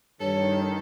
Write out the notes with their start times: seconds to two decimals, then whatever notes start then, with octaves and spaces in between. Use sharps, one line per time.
0.21 G2 D#3 A4 C#5